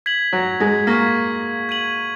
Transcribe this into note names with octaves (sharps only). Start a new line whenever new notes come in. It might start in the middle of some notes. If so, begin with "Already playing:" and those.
G#6 B6 F#7
F#3
G#3
A#3 C#6 G#6 B6
G#6 D#7 F#7